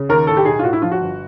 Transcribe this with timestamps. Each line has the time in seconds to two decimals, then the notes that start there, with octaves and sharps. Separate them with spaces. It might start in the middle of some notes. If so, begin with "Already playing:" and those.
Already playing: C#3
0.09 D#2 A#4
0.27 A2 A4
0.37 G4
0.45 B1 G#4
0.59 F4
0.63 A2 F#4
0.73 E4
0.82 F3 F4
0.92 F#4
1.01 G1